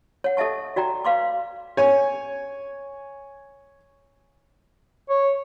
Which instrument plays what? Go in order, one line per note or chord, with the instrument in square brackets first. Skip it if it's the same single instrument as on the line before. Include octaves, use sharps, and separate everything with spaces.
[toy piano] C#5 F#5
A4 D#5 E5 A5 C#6
F#4 D5 G5 A#5
B4 F5 C6 D6
[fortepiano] C#5 G#5
[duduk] C#5